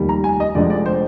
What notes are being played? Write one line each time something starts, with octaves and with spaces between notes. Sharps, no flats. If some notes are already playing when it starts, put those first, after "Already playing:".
Already playing: F1 D#2 D#3 G3
A#5
G#5
D#5
F1 F2 D3 G#3 D4 D5
D5
C5